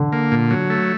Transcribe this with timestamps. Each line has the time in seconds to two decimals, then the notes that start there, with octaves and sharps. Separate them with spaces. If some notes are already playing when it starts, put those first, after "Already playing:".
Already playing: D3
0.12 A#3
0.32 A#2
0.51 F#3
0.70 A3